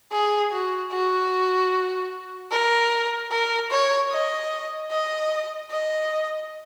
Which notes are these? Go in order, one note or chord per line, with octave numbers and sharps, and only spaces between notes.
G#4
F#4
F#4
A#4
A#4
C#5
D#5
D#5
D#5